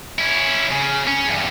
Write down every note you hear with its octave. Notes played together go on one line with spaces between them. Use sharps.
C#4 E4
C#3
C#4
E2 G2